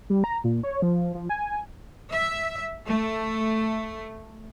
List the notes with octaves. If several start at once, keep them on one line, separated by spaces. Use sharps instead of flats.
G3
A#5
A#2
C#5
F3
F3
G#5
E5
A3